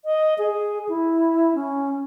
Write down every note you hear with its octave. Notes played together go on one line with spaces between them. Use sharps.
D#5
G#4
E4
C#4